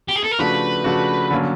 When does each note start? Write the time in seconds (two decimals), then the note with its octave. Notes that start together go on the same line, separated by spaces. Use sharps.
0.08 G4
0.16 G#4
0.23 A4
0.31 A#4
0.39 C#3 F3 A3 D4 F#4 B4
0.84 C#3 F3 A3 D4 F#4
1.31 D3 F#3 A#3 C#4